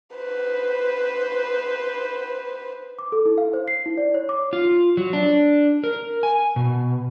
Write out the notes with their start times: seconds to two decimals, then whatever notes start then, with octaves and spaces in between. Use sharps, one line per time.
0.15 B4 C5
2.99 D6
3.12 A4
3.26 E4
3.38 F5
3.53 C5
3.68 C7
3.86 E4
3.97 D5
4.14 C#5
4.29 D6
4.53 F4
4.97 F#3
5.13 D4
5.84 A#4
6.23 G#5
6.56 B2